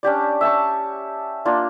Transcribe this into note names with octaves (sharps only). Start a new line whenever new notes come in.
C#4 D4 G4 D5
E5 A5 C#6
A#3 D4 F4